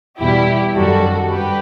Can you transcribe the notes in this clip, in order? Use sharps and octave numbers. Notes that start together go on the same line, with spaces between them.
E2 B2 G3 E4 G4
F#2 D#3 G3 F#4 A4
G2 G4 B4